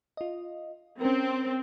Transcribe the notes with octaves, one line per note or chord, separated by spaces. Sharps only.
F4 D#5
C4 C#4 A#4